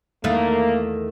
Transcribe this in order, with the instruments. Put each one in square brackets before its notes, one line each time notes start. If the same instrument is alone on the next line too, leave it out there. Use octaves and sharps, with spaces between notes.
[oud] E2 D#3 A3 [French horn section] A#3